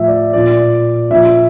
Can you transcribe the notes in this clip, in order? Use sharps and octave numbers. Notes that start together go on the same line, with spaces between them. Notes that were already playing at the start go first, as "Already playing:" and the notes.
Already playing: A2 F3 E5
D5
A#2 F3 D5
A#2 F3 E5